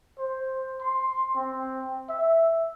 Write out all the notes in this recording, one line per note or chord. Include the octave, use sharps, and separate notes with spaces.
C5
C6
C4
E5